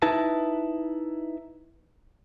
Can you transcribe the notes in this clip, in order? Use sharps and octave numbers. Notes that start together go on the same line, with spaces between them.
D#4 E4 B4 A5